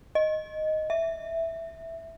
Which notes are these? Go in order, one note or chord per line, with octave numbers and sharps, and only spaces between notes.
D#5
E5